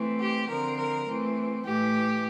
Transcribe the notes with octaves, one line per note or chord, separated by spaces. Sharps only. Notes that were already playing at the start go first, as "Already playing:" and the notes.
Already playing: E3 A3 C4
G4
D3 F3 C4 A#4
A#4
E3 A3 C4
A2 E3 A3 G4